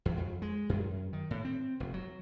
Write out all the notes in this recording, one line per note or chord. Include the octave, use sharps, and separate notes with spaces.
E2
F2
G#3
F#2
D#3
A2
C4
F1
F#3